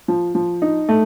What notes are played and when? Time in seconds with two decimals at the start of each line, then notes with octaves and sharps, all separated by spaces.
0.08 F3
0.35 F3
0.62 D#4
0.89 A3